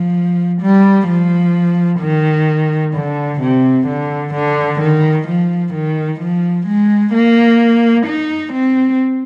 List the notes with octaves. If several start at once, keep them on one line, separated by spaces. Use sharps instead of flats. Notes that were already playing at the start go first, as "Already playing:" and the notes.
Already playing: F3
G3
F3
D#3
D3
C3
D3
D3
D#3
F3
D#3
F3
G#3
A#3
D#4
C4